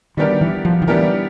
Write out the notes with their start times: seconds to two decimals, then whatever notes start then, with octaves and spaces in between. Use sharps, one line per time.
0.17 D#3 G3 B3 D4 G4 A#4
0.41 E3
0.65 F3
0.82 D#3
0.87 E3 G3 B3 D4 G4 A#4